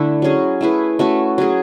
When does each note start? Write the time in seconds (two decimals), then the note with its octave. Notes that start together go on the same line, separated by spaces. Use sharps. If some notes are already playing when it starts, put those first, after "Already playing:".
Already playing: D3 A3 D4 E4 A4
0.22 F#3 C#4 G#4
0.61 A3 E4 G#4 B4
0.99 A3 C#4 F#4 A4
1.38 F#3 C#4 G#4